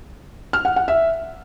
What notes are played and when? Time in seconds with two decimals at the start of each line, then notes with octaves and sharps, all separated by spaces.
0.53 F6
0.65 F#5
0.76 F#5
0.88 E5